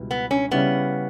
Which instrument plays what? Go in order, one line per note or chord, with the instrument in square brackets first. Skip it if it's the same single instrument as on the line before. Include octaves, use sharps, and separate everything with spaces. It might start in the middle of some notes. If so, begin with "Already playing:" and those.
Already playing: [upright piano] C#2 B2 G3 E4
[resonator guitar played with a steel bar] B3
C#4
[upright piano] C#3 G3 C#4 E4 [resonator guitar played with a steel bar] B3